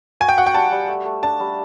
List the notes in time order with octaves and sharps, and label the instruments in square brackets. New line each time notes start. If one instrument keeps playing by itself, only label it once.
[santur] F#4 [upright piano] G#5
[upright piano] G5
[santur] F#4 [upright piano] F#5
[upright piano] G5
[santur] G3 [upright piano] A5
[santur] G3
A3
A3
[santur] D4 [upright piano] A5
[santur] G3